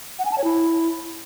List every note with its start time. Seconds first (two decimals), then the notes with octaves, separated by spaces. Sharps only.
0.19 F#5
0.25 G#5
0.32 A5
0.38 C#5
0.44 E4